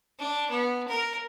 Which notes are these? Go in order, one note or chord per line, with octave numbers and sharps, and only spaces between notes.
D4
B3
A#4